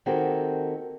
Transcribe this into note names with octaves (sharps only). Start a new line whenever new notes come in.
D#3 A#3 C4 F#4 G4 A4